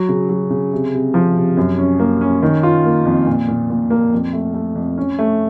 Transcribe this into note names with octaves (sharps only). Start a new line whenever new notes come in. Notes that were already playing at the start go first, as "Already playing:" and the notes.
Already playing: F#3
C#3
F#3
C#3
C3
C3
F3
C3
F#2
C#4
A#3
C#4
D#3
F4
A#3
F2
A#2
A#2
A#2
A#3
F2
A3
A3
F2
C#4
A3